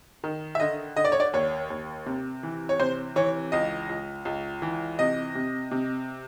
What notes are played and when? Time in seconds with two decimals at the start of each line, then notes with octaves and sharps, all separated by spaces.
0.24 D#3
0.55 E5
0.60 D3 D#5
0.96 D3 D#5
1.05 D5
1.12 C#5
1.20 D5
1.33 D#2 C#5
1.70 D#2
2.06 C3
2.43 E3
2.69 C#5
2.79 C3 C5
3.16 E3 C#5
3.52 C#2 D#5
3.89 C#2
4.25 C#2
4.62 E3
4.99 C3 D#5
5.35 C3
5.71 C3